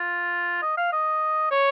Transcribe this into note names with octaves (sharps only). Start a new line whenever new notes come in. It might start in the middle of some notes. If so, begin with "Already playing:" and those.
Already playing: F4
D#5
F5
D#5
C#5